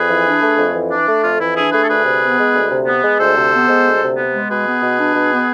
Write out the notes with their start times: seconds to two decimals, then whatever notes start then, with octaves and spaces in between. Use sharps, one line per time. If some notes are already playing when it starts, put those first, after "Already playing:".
Already playing: F2 G#4 B4
0.09 E3
0.26 D4
0.42 A3
0.58 F2
0.75 E3
0.91 D4
1.08 A3
1.24 F2 F4
1.40 E3 E4
1.56 D4 E4 G#4
1.72 A3 G#4 B4
1.84 A4
1.89 D2 G#4 B4
2.05 C3
2.21 B3
2.38 G#3
2.54 D2
2.71 C3
2.86 B3
3.03 G#3
3.19 D2 A4 C5
3.36 C3
3.52 B3
3.68 G#3
3.85 D2
4.02 C3
4.17 B3
4.33 G#3
4.50 B2 G#4 B4
4.66 B3
4.83 B2
4.99 D4
5.15 B2
5.31 B3